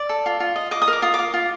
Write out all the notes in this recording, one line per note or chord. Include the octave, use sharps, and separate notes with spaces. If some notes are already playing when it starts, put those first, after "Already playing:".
Already playing: D5 D6
A4
F4
F4
D#5
D#5 D6
D#6
A#4 D6
F4 D#6
D6
F4
F4